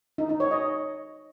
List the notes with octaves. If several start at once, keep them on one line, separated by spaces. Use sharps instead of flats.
D#4
D#4
C#5
D#5